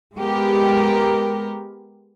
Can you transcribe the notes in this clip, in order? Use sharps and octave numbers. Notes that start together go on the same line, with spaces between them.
G#3 B3 G4 A#4